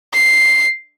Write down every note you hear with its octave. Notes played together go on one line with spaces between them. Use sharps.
C7